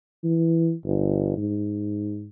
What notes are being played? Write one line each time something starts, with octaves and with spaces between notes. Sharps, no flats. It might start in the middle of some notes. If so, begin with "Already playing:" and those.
E3
G1
G#2